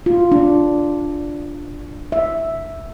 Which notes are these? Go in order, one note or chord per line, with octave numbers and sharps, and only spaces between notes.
F4
D4
E5